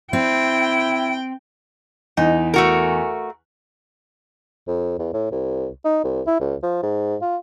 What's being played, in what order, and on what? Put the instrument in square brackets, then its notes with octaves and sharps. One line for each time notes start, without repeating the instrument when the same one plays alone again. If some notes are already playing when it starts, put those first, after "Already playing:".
[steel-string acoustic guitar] C4 [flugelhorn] E4 [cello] G5
[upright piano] E2 [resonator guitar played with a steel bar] D#4
[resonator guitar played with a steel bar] A3 F#4 A#4
[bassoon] F2
E2
A2
C2
D#4
C2
E4
C#2
F3
G#2
F4